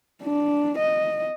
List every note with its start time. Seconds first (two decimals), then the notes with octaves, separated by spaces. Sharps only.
0.23 D4
0.78 D#5